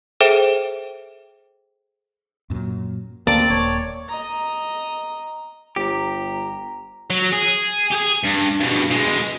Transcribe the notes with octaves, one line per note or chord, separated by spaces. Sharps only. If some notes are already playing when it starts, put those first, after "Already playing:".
G#4 A4 C5 E5 G5 D7
F#2 A#2 F#3
D2 A#3 C4 D5 A5 A6
D#1 C#5
D#5 A#5
G1 G4 A#5
F#3
G#4
G4 G#4
G2
G2 B2
B2 G#3